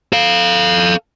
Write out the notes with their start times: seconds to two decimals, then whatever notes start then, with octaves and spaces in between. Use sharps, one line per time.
0.13 A4 F5